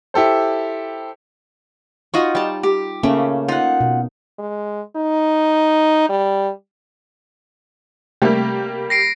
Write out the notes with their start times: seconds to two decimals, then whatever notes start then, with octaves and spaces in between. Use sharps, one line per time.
0.14 E4 G4 A4 C5
2.14 D#4 F4 F#4 D#5 C#6
2.35 G3 A5
2.63 G4
3.03 C#3 A3 A#3 C#4
3.48 D#4 F4 F#5
3.80 B2
4.39 G#3
4.96 D#4
6.09 G3
8.22 C3 G3 A3 A#3 G4
8.90 A#6 C7 D7